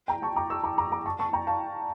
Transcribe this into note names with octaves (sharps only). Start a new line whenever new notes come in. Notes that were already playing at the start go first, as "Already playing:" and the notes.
G5 A#5
A5 C#6
A#5 D6
C#6 E6
A#5 D6
A#5 D6
A#5 D6
A5 C#6
A5 C#6
G5 A#5
F5 A5